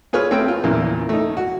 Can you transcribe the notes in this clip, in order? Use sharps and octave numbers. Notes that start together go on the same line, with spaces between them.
F4 G#4 B4 C#5 F6
A3 C4 G#4 B4 G5 E6
F4
E2 A#2 C#3 E3
A3 D#4
F#4